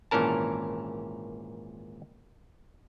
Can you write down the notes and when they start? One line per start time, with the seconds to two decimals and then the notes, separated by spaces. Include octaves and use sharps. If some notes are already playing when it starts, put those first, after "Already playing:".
0.11 G#1 A#2 E3 C#4 A#4 A5